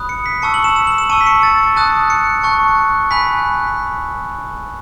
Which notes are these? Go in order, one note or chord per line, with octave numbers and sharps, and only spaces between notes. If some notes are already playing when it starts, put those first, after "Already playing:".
Already playing: B5 D#6 F#6
C#7
B6
A5 C#6 E6 C#7
F#7
E7
E7
F#7
E7
A5 C#6 E6 D#7
B6
C#7
A6
A5 D#6 F#6
C#7
A5 C#6 F#6
G#5 B5 F#6 B6